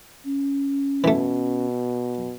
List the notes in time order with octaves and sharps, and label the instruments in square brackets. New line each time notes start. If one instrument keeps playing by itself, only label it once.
[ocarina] C#4
[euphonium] B2 [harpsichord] E3 A3